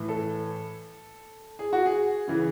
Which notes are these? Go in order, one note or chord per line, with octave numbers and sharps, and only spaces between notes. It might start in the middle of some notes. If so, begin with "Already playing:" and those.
Already playing: A2 E3
A4
G#4
F#4
G#4
C#3 E3